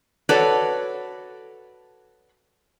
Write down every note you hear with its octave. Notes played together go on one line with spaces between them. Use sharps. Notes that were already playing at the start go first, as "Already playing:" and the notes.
F#4 A4 B4 C#5 D5